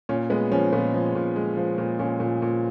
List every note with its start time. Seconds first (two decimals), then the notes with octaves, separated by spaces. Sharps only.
0.09 A#2 C#4
0.30 G#3 B3
0.51 F3 C#4
0.72 A#2 B3
0.94 F3
1.15 A#2
1.36 G#3
1.57 F3
1.78 A#2
1.99 A#2 C#4
2.20 A#2
2.42 A#2